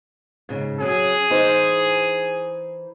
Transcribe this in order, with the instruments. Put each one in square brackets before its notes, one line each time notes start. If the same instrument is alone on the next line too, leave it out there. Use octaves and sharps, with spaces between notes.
[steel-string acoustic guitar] G#2 C#3
[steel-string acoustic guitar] F#3 C#4 [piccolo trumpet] G#4
[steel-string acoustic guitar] E3 D#4 C5